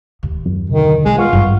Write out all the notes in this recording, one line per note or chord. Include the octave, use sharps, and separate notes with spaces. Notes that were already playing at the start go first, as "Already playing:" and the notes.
D1 D#2
F#2
B2 D3 D#3
C2 G#3
B3 F4 F#5 C#6 F6
G#1 G2 C4